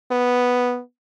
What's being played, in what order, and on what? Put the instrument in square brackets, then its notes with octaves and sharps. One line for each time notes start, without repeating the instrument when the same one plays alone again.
[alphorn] B3